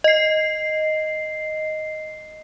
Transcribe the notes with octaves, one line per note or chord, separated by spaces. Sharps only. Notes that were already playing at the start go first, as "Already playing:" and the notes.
D#5 C7